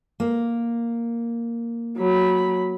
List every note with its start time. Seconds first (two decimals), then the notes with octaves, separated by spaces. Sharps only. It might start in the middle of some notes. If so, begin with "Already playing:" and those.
0.20 A#3
1.97 F#3 B5